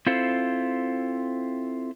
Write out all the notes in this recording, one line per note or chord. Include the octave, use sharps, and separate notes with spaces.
C4 E4 F4 A4 C5